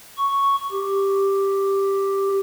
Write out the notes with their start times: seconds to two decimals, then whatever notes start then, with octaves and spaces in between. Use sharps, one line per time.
0.17 C#6
0.72 G4